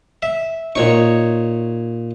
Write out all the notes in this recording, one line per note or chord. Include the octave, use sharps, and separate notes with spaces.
E5
A#2 D#4 C#5 C#6